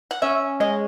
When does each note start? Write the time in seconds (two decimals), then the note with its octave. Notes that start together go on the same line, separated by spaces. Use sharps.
0.11 F#5
0.22 C#4 E5
0.60 G#3 D#5